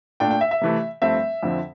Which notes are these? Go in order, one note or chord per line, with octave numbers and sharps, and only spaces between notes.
A#2 A3 D4 G5
G5
E5
E5
C3 E3 A3
G2 F3 A3 C4 E5
F2 D3 F3 C4